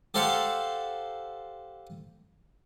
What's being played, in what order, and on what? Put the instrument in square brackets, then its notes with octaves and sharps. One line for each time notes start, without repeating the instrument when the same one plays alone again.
[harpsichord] G4 A4 C5 F5 F#5